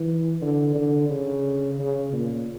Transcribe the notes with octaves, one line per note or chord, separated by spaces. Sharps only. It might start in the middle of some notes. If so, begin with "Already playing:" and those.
Already playing: E3
D3
D3
C#3
C#3
A#2